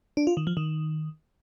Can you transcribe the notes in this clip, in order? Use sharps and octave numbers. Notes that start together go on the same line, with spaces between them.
D4
F4
D#3
F3
D#3